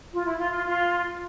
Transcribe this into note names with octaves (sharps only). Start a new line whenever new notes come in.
F4
E4
F4
F4
F4